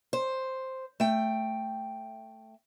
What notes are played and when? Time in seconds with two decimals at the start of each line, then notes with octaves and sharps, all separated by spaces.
0.13 C5
1.00 A3 G5